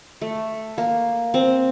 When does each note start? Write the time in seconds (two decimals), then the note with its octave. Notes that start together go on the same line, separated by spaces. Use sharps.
0.21 A3
0.78 A#3
1.34 C4